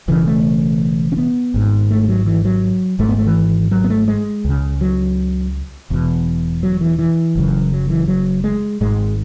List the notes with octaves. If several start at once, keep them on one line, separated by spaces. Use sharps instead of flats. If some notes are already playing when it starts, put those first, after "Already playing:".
E1 E2 C#3 E3
A3
C#4
B3
G#1 G#2
A3
F#3
E3
F#3
G#1 G#2 A3
B3
A3
E3
F#3
B3
A3
G#3
C#2 C#3
F#3
E1 E2 B2
F#3
E3
E3
F#1 F#2 C#3
F#3
E3
F#3
G#3
G#1 G#2 G#3